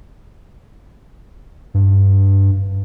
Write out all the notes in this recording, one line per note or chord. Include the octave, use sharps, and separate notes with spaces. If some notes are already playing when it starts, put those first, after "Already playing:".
G2